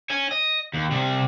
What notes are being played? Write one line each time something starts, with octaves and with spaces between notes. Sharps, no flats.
C#5 G#5
D#5
D#2
C3 G3